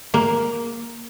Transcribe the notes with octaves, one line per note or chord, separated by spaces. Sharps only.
A#3